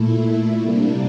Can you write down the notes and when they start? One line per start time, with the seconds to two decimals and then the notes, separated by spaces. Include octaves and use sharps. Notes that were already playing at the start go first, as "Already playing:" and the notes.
Already playing: A#2 A3 E4
0.61 C3 G3 A#3 D4